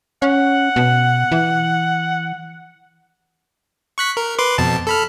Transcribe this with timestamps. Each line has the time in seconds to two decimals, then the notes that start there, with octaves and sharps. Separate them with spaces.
0.22 C#4 F#5
0.76 B2
1.32 E3
3.98 C#6 F#6 B6
4.17 A#4
4.38 B4 C6 D6
4.58 F2 B2 A5
4.87 A4 B5 F6